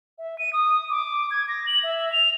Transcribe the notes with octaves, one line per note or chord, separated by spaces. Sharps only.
E5
D#7
D#6
D6
G#6
A#6
F#7
E5
F7